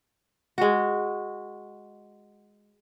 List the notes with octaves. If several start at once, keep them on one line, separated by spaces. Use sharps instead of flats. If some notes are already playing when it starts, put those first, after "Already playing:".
G#3 F#4